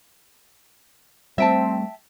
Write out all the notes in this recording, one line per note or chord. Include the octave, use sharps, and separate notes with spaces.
G3 A3 C4 E5 G5 A5